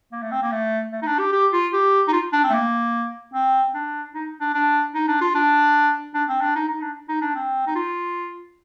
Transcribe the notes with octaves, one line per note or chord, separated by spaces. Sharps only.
A#3
A3
C4
A#3
A3
A3
D#4
D4
G4
G4
F4
G4
D#4
F4
D4
C4
A3
A#3
C4
D4
D#4
D4
D4
D#4
D4
F4
D4
D4
C4
D4
D#4
D#4
D4
D#4
D4
C4
D#4
F4